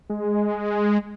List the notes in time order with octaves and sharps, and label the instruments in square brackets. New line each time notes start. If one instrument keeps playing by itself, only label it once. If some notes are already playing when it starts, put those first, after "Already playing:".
[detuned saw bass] G#3